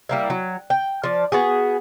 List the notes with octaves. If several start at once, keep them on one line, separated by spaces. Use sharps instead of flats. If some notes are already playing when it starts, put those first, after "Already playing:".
G3 A#3 E4
F#3
G5
F3 D5
B3 F#4 G#4